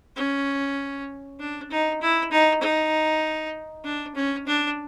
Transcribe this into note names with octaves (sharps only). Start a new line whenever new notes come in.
C#4
D4
D#4
E4
D#4
D#4
D4
C#4
D4